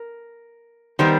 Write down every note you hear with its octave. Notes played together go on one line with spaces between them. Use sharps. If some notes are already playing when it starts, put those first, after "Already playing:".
Already playing: A#4
D#3 G3 B3 A#4 C5